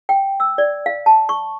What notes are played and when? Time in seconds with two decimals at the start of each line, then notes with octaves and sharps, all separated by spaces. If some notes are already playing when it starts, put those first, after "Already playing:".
0.09 G5
0.40 E6
0.58 D5
0.86 F5
1.06 A5
1.29 C#6